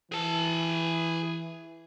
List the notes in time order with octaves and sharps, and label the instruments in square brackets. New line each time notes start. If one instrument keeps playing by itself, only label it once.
[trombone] E3 [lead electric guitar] G#4 A5